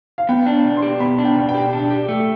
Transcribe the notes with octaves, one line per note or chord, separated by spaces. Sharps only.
F5
B3 G5
D4
B2
C6
G4
B3 B5
D4
G5
B2
G5
G4
D4
G4
A3